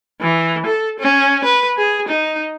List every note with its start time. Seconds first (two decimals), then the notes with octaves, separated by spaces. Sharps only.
0.21 E3
0.66 A4
1.00 C#4
1.44 B4
1.78 G#4
2.09 D#4